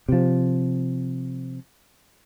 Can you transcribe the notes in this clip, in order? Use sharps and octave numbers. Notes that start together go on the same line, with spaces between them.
C3 F3